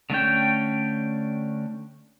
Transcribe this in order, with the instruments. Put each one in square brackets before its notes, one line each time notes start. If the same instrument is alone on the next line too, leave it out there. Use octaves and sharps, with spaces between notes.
[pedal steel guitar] D3 A3 C#4 G5